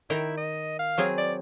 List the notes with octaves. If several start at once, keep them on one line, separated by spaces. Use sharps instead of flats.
D#3 E4 G5 A#5
D#5
F5
F#3 C4 G#4
D5